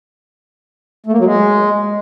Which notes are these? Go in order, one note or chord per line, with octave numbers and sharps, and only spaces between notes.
A3
A#3
F#3
G#3